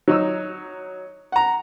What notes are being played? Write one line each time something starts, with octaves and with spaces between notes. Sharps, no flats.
F#3 D#4 E6
F#5 A#5